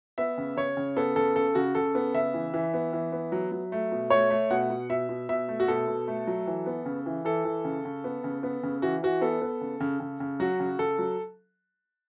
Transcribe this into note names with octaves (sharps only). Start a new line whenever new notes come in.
B3 E5
C#3
C#3 C#5
C#3
B3 A4
C#3 A4
C#3 A4
C#3 F#4
C#3 A4
B3
C#3 E5
E3
E3
B3
E3
B3
F#3
F#3
A3
B2
A3 C#5
A3
B2 F#5
B2
B2 E5
B2
B2 E5
A3
F#4
B2 A4
B2
A3
F#3
E3
B3
C#3
E3
E3 A4
E3
C#3
C#3
B3
C#3
B3
C#3
E3 F#4
E3 F#4
B3 A4
B3
C#3
C#3
C#3
C#3
F#3 F#4
C#3
C#3 A4
F#3